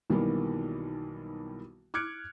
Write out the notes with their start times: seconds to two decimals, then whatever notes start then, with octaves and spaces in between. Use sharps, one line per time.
0.10 B1 D#3 E3 G3 A#3 B3
1.94 D6 F6 F#6 G#6 C#7 D7